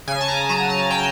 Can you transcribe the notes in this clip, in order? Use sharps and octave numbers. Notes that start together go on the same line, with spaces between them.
C#3 G#5
A5
A#5
F#3 A#5
A5
F#3 G5